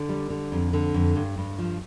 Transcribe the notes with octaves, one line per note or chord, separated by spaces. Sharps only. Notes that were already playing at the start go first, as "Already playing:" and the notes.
Already playing: D3
G3
D3
F2
D3
F2
G2
G2
F3